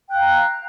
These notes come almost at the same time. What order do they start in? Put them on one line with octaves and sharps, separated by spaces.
G5 F#6 F5 A#5